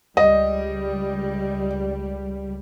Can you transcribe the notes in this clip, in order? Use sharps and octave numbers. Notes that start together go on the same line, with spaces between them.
C#2 G3 D#5